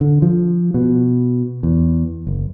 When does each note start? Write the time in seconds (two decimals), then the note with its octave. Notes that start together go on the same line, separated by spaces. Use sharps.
0.01 D3
0.22 F3
0.74 B2
1.63 E2
2.27 F#1